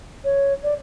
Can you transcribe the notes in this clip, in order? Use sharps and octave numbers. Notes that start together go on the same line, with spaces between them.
C#5
D5